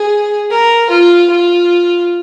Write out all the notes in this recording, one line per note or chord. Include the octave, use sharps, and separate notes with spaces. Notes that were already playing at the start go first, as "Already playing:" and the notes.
Already playing: G#4
A#4
F4
F4